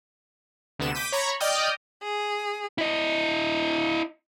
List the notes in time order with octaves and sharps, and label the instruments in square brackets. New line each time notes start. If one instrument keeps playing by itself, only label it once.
[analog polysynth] D2 C3 B3 E7
D6 G6 B6 D#7
C#5 A#5 B5 C#6
D5 D#5 G5 D#6 F6 G6
[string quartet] G#4
[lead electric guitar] E4 D#5